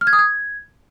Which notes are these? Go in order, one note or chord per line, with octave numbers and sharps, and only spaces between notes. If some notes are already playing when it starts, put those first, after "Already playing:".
F6
G#6
D#6
G#6